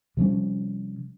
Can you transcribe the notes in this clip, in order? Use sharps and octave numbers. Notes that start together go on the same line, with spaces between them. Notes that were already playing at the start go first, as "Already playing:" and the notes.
C3 F3 G3 C#4